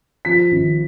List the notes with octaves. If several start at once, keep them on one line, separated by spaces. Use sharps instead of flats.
F3 B6
G#1